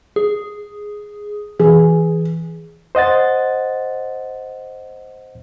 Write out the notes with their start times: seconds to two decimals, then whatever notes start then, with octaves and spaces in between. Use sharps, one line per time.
0.16 G#4
1.59 E3 G#4
2.95 C5 D#5 F#5 A6